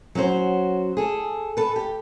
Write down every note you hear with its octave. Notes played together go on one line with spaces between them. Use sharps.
F#3 C#4 F#4 C5
G#4 A4
A4 B4
G4